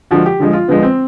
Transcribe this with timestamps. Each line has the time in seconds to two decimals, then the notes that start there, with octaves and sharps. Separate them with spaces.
0.11 D3 F3 G#3 F#4
0.26 G4
0.40 D3 F3 G#3
0.53 F4
0.68 D3 F3 G#3 B3
0.83 C4